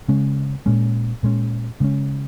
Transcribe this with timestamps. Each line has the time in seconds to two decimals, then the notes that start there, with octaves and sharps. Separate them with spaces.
0.08 C#3 G#3 C#4
0.66 A#2 G#3 C#4
1.23 A#2 G#3 C#4
1.80 C#3 G#3 C#4